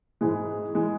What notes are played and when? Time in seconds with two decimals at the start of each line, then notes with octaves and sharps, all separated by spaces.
0.21 G#2 E3 G#3
0.75 E3 G#3